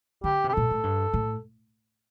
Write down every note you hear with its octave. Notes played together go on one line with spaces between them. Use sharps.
D3 G4
C3
G4
A#2 A4
A2
G2
A2